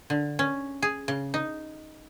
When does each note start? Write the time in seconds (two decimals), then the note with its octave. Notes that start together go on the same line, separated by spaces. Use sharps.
0.10 D3
0.39 C#4
0.82 G#4
1.08 C#3
1.34 D#4